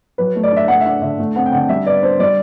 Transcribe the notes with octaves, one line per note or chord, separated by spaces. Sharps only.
F#3 B4
A3
D5
D4 E5
A3 F#5
E5
D4 F#5
D3 E5
A3
C4 F#5
G5
D3 F#5
G3 E5
B3 D5
D4 C5
G3 D5